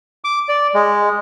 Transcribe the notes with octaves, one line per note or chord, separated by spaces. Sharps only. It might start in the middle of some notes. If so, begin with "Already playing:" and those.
D6
D5
G#3